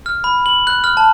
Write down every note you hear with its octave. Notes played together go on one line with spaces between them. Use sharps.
F6
B5
F#7
F#6
F6
A5